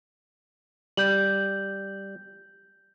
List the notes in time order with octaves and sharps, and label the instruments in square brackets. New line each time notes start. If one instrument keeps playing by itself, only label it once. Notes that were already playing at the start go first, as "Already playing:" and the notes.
[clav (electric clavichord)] G3 [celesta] G6 F#7